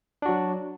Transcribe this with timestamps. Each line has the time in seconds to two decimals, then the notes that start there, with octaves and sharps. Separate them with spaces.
0.22 D4
0.26 F#4
0.29 F#3